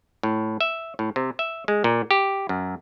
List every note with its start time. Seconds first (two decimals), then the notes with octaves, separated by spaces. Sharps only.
0.23 A2
0.61 E5
0.99 A2
1.16 C3
1.39 E5
1.68 G#3
1.84 A#2
2.11 G4
2.49 F#2